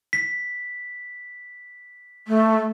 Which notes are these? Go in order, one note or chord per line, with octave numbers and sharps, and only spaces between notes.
B6
A3